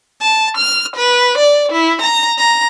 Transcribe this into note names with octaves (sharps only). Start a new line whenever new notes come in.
A5
F6
B4
D5
E4
A#5
A#5